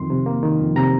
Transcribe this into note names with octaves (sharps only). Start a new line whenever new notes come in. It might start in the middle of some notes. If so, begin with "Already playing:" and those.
Already playing: F2 D#3 C6
C3
A#3
D#3
F2
C3 A#5